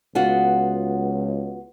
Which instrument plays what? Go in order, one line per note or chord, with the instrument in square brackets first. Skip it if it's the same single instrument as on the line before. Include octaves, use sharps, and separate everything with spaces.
[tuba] C#2 [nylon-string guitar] B3 F4 F#4